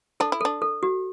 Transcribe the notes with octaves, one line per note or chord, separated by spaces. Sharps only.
D4 A4
E4
D4 A4
A4
F#4